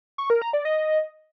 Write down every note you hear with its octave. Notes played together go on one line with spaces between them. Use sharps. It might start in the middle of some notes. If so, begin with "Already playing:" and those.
C#6
A#4
A#5
D5
D#5